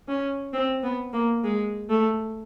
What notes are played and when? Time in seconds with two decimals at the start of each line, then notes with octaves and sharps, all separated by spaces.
0.08 C#4
0.53 C4
0.83 B3
1.13 A#3
1.44 G#3
1.90 A3